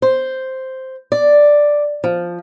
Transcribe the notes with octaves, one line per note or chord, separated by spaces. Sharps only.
C5
D5
F3